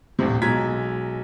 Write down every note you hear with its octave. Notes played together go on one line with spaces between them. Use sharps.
D#1 A#1 A2 C3
B1 F#3 G#3 A#5 G#6 B6